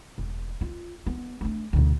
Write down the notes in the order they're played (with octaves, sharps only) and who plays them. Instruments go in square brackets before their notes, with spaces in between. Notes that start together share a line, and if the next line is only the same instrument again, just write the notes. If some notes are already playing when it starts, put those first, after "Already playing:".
[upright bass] E1
F4
B3
A3 D4
D2 B2